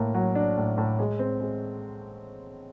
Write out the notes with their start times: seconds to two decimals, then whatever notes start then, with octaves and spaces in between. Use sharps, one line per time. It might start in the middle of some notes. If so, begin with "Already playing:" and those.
Already playing: A2 A#3
0.14 F#3
0.35 D4
0.57 A2
0.78 A2
0.99 G#3
1.19 C4
1.40 G#3